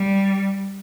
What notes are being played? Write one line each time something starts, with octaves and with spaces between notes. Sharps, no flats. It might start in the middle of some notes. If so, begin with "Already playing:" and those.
Already playing: G3